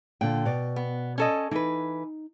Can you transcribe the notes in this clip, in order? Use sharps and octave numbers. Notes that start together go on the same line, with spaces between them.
A#2 D3 G5
B2 D5
B3
C#4 A4 D#5
E3 D#4 B4